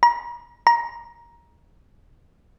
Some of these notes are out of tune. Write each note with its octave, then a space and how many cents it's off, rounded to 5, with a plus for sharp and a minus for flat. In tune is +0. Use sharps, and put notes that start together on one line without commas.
A#5 +40
A#5 +15